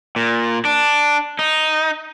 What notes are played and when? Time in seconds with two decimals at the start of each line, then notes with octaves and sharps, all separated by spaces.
0.16 A#2
0.65 D4
1.39 D#4